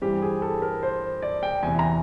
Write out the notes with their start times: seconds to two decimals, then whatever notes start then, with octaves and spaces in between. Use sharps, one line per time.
0.02 G2 E3 G3 C4 G4
0.22 G#4
0.42 A4
0.62 A#4
0.83 C5
1.22 D5
1.43 G5
1.63 E2 C3 E3 G#5
1.79 A#5